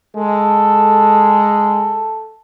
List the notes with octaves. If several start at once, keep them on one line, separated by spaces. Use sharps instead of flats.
G#3 A4